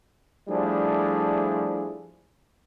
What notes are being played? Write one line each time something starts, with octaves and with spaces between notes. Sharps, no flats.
F3 G3 A3 D4 E4 G#4